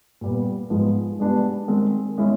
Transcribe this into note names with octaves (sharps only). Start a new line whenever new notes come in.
A#2 G3 B3
G#2 F3 G#3 B3
B2 G#3 B3 D4 G4
D#3 G#3 C4
B2 G#3 C#4 E4